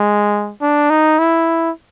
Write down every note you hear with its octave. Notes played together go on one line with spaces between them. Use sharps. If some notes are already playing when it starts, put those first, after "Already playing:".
Already playing: G#3
D4
D#4
E4